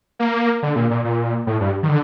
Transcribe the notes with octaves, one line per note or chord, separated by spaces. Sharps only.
A#3
D3
A#2
A#2
A#2
A2
G2
D#3
D3